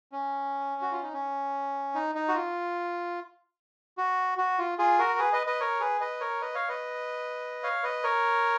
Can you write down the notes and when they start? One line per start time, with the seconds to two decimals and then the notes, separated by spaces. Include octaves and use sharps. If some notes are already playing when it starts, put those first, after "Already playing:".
0.12 C#4
0.82 F#4
0.92 F4
1.03 D#4
1.13 C#4
1.95 D#4
2.15 D#4
2.29 F#4
2.34 F4
3.98 F#4
4.38 F#4
4.59 F4
4.79 F4 G#4
4.99 F#4 A#4
5.19 G#4 B4
5.33 B4 D#5
5.47 B4 D#5
5.60 A#4 C#5
5.80 G#4 B4
6.00 B4 D#5
6.20 A#4 C#5
6.41 B4 D#5
6.55 C#5 F5
6.69 B4 D#5
7.63 C#5 F5
7.83 B4 D#5
8.04 A#4 C#5